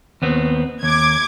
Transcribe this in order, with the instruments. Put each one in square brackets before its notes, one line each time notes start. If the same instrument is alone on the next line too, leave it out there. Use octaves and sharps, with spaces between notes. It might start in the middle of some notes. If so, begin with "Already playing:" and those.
[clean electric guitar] D#2 B3 C4
[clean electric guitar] D#2 [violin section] D6 G#6